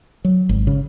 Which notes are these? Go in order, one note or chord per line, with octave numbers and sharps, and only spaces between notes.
F#3
G#1
C#3